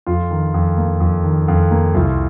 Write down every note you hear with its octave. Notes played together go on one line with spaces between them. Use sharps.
F2 F4
D#3
F2
A#3
F2
D#3
F2
A#3
C2 F4